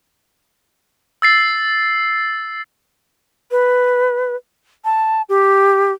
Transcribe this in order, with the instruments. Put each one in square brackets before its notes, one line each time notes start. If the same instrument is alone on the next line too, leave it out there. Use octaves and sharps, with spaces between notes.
[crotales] E6 A6 C7
[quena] B4
A5
G4